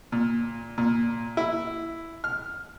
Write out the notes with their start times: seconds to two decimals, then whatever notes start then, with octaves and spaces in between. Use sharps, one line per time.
0.12 A#2
0.78 A#2
1.37 E4
2.24 F6